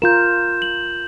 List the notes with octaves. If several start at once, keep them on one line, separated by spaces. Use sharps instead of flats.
F4 A#4 G6 E7
F#7